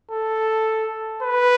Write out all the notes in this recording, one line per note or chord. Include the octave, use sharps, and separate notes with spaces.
A4
B4